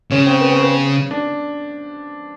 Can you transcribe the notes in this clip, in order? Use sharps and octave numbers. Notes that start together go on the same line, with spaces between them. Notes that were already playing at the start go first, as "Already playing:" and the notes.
C#3 C#4
C4
B3
C4
B3
D4